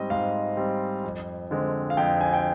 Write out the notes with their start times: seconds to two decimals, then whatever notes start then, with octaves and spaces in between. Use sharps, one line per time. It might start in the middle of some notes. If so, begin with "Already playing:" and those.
Already playing: G#2 G3 C4 D#5
0.10 G#2 F5
0.57 G3 C4
1.04 F2
1.51 D3 G#3 C4
1.90 F5
1.97 F2 G5
2.21 G#5
2.33 G5